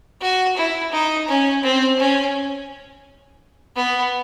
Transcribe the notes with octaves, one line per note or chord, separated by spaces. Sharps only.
F#4
E4
D#4
C#4
C4
C#4
B3